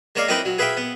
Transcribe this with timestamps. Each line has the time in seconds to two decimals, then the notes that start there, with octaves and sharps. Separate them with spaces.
0.15 G#3 A#3 C#5 D5 F5
0.28 C4 D#4 E4 A#4 B4 G5
0.45 F#3
0.58 G#4 B4 E5 F5 G5
0.77 B3